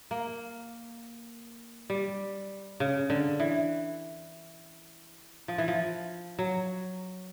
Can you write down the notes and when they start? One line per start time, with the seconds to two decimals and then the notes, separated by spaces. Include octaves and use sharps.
0.11 A#3
1.90 G3
2.80 C#3
3.10 D3
3.40 E3
5.48 F3
5.58 E3
5.68 F3
6.39 F#3